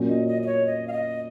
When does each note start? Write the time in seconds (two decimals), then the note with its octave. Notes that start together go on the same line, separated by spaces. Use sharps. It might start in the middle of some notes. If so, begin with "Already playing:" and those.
Already playing: A#2 F#3 C#4
0.09 D#5
0.28 D#5
0.43 D#5
0.46 C#5
0.67 D#5
0.88 F5
0.93 D#5